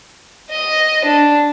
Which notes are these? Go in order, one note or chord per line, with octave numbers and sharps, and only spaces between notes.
D#5
D4